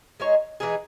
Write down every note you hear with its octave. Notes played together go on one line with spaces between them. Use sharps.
G#3 D#4 G#4 C#5
E3 G#3 D#4 G#4